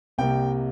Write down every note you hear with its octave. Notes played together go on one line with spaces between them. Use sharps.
C2 C3 G3 A#3 G5